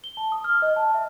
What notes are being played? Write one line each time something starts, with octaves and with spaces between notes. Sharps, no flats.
G7
A5
D#6
F6
D#5
A5
E5